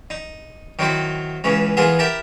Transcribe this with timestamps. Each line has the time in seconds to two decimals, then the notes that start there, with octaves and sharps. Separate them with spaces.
0.10 D#4
0.79 D#3 F#3 C4 E4
1.44 C#2 E3 C#4
1.77 E3 B3 F4 G#4 A#4 D#6
1.99 E4 G4 A#4 A5 A#5